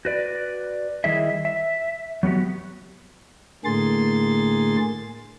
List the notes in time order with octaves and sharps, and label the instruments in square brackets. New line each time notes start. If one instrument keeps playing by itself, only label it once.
[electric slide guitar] F#4 B4 D5
D#3 G3 E4 G#4 D#5 E5
E5
F#3 B3 F#4 G4
[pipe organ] A2 D3 A#3 G#4 C6 A6